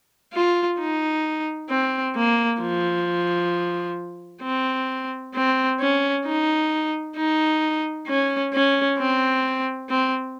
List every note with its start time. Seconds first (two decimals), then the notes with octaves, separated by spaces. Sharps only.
0.33 F4
0.79 D#4
1.70 C4
2.15 A#3
2.61 F3
4.43 C4
5.35 C4
5.80 C#4
6.26 D#4
7.17 D#4
8.08 C#4
8.53 C#4
8.99 C4
9.90 C4